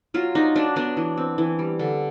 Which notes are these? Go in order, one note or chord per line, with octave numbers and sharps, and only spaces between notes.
F#3 F4
D4 D#4
F#3 D4
B3 D4
E3
C4
E3
G3
D3